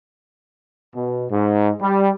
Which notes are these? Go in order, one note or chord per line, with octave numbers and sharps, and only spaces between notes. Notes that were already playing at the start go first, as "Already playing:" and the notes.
B2
G#2
G3